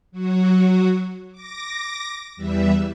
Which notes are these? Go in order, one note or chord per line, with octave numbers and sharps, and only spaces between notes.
F#3 F#4
D6 A#6
E2 E3 G3 E5